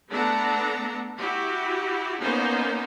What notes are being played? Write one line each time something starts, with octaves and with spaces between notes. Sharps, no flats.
A3 B3 D4 A4 F#5 A#5
E4 F#4 G4
A#3 B3 C#4 D#4 C5